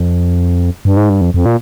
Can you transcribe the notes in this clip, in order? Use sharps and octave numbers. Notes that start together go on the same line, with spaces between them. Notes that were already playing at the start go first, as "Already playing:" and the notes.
Already playing: F2
G2
G#2
G2
F2
F2
A#2